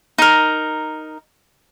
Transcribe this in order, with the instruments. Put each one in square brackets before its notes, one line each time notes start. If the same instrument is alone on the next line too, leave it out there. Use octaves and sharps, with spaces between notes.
[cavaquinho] D#4 A#4